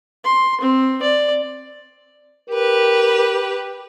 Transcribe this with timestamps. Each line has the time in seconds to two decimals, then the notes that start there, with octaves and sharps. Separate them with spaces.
0.24 C6
0.61 C4
1.02 D5
2.49 G4 A#4 B4